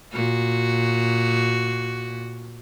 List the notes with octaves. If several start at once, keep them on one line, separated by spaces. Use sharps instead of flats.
A#2 F#4